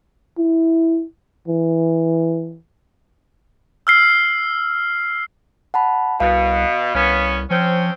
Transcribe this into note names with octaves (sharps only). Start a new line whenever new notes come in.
E4
E3
E6 F6 C7
F#5 A5 B5
C2 B2 F5
C2 B3 C#4
F3 C4 C#4